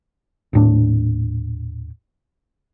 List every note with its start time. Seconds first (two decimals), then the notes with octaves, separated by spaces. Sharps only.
0.53 D#1 A2 D4